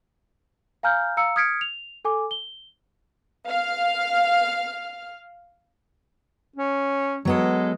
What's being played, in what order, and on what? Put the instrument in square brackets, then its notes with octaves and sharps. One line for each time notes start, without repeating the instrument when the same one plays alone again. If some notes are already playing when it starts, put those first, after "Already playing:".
[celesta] F5 G#5 A#5 F6 G6
F5 A#5 E6 C#7
D#6 F6 G#6 B6 C#7 D7
F7
A4 G#5 D6
G7
[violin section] F5 F6
[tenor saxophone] C#4
[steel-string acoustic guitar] F#3 B3 A4 [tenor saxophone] G#3